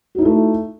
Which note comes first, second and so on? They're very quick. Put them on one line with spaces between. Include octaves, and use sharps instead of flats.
F#4 D#4 E4 A3